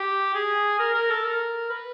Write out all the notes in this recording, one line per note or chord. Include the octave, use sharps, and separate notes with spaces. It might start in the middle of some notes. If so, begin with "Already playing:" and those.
Already playing: G4
G#4
A#4
A#4
A4
A#4
B4